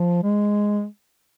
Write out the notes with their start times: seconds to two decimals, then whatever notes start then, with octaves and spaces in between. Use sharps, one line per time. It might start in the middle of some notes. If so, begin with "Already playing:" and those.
Already playing: F3
0.23 G#3